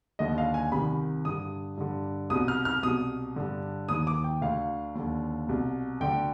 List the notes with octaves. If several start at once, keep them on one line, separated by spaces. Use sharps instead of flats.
D#2 D3 D#5
F5
G#5
C2 C3 D#3 B5
G2 D3 D#6
G2 D3
C2 B2 D#6
F6
F6
C2 B2 D#6
G2 D3
D#2 D#3 D#6
D6
G5
D2 D3 F5
D#2 D3
C2 B2
D2 D3 G5